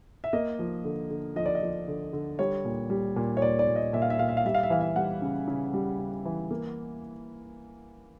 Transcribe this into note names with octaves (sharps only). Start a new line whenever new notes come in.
E5
A#3 D#5
F3
D3
D3
F3 D#5
D5
D#5
F3
D3
D3
G3 C#5
A#2
G3
A#2
C#5
A#2 D5
D5
A#2
D#5
A#2 E5
F5
E5
A#2 F5
E5
F5
G3 E5
F5
E5
E3 F5
E5
G3 F#5
C#3
C#3
G3
C#3
E3
A#3